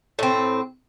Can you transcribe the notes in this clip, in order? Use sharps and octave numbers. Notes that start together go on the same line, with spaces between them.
A2 C4